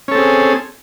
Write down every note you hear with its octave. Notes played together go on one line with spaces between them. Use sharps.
C4 C#4 G#4 A4